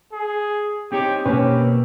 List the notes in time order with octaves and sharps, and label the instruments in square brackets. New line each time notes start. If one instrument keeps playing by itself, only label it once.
[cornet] G#4
[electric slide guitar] C4 D#4 C#5 [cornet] G4
[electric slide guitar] B2 A#3 C4 [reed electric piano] C#4 B4 [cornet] G4